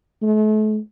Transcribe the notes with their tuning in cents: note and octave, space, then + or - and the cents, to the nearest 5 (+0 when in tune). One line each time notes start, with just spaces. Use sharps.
A3 -40